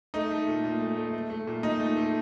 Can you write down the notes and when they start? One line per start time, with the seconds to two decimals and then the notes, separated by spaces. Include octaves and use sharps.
0.14 A3 D#4
0.31 A3
0.47 A#2
0.64 A#2
0.81 A3
0.97 A3
1.14 A3
1.30 A3
1.47 A#2
1.63 A#2 D#4
1.80 A3
1.97 A3